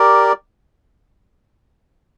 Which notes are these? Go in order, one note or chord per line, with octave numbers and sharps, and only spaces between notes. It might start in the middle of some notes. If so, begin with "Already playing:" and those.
Already playing: G4 A#4 D5